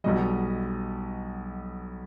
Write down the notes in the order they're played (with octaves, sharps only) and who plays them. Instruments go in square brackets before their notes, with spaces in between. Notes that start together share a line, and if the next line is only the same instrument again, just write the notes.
[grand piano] B1 B2 G3 D#5